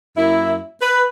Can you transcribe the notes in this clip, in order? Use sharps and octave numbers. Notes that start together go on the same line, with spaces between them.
F#2 A#3 E4
B4